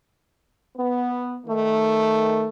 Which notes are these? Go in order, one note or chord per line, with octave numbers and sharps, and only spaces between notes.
B3
D#3 A3